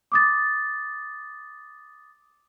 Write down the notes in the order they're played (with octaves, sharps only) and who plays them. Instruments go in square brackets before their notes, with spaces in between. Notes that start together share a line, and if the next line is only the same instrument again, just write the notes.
[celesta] D6 D#6 A6